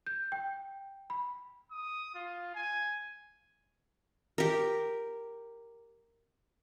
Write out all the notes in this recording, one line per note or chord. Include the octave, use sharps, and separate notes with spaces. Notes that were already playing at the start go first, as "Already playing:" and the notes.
G6
G5
B5
D#6
F4
G#5
G4 A#4